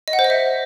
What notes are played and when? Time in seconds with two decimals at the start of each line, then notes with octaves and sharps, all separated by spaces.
0.08 D#5
0.13 F#5
0.19 C5
0.24 D#5
0.30 E5